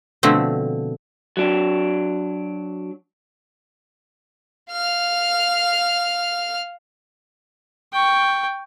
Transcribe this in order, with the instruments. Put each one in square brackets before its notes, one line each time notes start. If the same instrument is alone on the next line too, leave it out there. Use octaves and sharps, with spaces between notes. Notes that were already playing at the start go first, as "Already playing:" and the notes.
[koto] B2 D3 F3 A3 C4
[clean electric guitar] F#3 D4
[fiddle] F5 F6
[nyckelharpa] G5 C#6